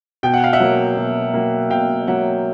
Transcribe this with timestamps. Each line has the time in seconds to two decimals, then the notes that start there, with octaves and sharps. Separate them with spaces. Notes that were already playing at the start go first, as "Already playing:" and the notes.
0.23 B2 G5
0.34 F#5
0.44 F5
0.53 E5 F#5
0.60 F#3 A#3
0.97 B2
1.34 F#3 A#3
1.70 B2 F5 G5
2.07 F#3 A#3 E5 F#5